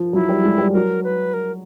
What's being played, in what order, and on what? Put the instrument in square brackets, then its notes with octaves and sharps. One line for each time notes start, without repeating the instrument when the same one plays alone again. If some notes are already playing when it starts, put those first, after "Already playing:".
Already playing: [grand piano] F3
[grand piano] F#3 [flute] E4
[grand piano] G3
G#3
G3
[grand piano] F#3 [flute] A#4
[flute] B4
A#4